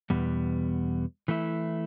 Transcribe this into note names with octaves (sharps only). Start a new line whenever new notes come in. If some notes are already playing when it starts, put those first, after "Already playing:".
E2 B2 G3 B3
E3 A3 E4